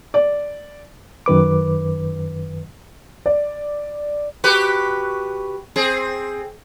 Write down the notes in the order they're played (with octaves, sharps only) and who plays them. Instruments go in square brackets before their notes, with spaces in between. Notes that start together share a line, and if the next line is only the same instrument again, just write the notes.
[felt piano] D5
[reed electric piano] F#2 D#3 B4 D6
[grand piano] D5
[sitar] F#4 G4 B4
C4 G#4